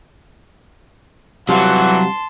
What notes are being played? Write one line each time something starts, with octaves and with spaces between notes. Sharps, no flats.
C3 E3 F#3 G3 F4 F#5 A5 C6